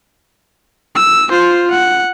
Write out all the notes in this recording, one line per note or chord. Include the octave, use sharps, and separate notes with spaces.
E6
F4 C5
F#5